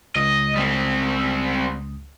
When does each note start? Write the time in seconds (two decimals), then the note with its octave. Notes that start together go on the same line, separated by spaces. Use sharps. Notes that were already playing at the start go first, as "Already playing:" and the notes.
0.16 C#2 D#5 D#6
0.56 G3 C4